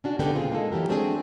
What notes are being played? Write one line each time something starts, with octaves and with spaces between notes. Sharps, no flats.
C#4 D4 F#4
D3 D#3 A#3 B3 G4 G5
A#2 C#3 C4 F4 G#4
G#3 A#3 D#4 A4
E3 F#3 G4 A#4
G#3 A3 C4 D4 F#4 G#4